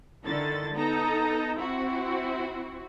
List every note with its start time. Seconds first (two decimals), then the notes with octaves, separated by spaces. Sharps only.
0.24 D3 D#3 E4 A4 A6
0.75 B3 D#4 A4 A#5
1.58 C4 E4 F#4